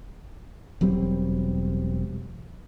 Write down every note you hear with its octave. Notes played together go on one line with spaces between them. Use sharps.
E1 F#3 G3 C4